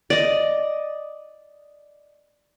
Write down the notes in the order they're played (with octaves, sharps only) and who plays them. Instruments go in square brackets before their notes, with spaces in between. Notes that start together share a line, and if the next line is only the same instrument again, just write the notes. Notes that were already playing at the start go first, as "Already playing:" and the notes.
[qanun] D5 D#5